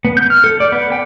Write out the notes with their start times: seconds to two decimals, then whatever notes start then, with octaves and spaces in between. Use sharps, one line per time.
0.05 B3
0.17 G6
0.30 F6
0.44 A4
0.60 D5
0.72 B3
0.92 G5